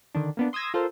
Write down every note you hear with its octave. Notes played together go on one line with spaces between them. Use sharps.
D3 D#3 D4
A#3 B3 D4
C6 D#6 E6 G#6 A#6
F4 A4 A#4 C5